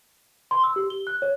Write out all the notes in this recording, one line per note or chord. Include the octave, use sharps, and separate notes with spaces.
C6
E6
G4
G7
F#6
C#5